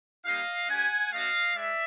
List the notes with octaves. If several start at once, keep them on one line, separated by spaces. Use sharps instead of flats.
G3 A#3 D#4 G4 D#5 F5
A3 D4 G4 F#5 G#5
A3 C#4 F#4 D#5 F5
G#3 D5 E5